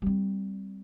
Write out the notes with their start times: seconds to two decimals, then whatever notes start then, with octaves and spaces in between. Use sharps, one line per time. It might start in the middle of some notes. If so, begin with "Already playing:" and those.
0.02 G3 C4